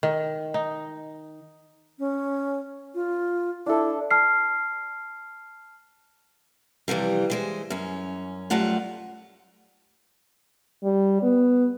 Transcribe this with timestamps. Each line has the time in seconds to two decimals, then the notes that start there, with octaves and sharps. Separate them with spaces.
0.03 D#3
0.54 D#4
1.99 C#4
2.95 F4
3.66 D4 E4 A4
4.11 A5 F6 C7
6.88 F2 C3 E3 G3
7.30 E3 G#3 C5
7.70 F#2 C#4
8.50 F#2 F#3 G3 A3 F4 F#5
10.84 G3
11.23 B3